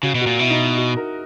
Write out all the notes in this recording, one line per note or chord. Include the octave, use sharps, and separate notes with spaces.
C#3 F#4
B2
F#4
A#2
B2 E4
D#4
E4
F#4
A#4